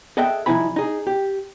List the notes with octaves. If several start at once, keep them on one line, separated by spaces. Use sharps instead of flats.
G#4 A4 D#5 E5 F#5 G5
C2 F3 D#4 E4 G#5 B5
D#4 G#4
G4